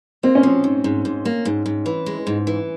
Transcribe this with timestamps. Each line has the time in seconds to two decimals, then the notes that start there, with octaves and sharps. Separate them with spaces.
0.23 A#3 C4
0.35 C#4
0.43 F3 C4
0.64 G#2
0.84 G#2
1.05 G#2
1.25 A#3
1.45 G#2
1.66 G#2
1.86 E3
2.06 G#3
2.27 G#2
2.47 E3